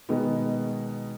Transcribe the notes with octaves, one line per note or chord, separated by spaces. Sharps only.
B2 D#3 G#3 B3